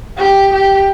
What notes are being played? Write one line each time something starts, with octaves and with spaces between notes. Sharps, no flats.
G4
G4